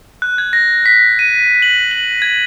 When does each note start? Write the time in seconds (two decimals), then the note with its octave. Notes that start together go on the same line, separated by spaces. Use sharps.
0.22 F#6
0.38 G#6
0.53 A#6
0.86 B6
1.19 D#7
1.62 F#7
1.91 F#7
2.22 G#6